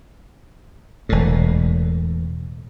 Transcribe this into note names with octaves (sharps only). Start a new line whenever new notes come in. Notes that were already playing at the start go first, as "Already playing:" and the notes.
E1 A2